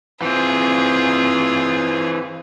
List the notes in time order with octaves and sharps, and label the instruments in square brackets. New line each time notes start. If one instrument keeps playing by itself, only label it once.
[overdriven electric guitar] E3 C4 [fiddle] F4 G#4